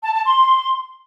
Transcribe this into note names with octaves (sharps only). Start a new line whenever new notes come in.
A5
A5
C6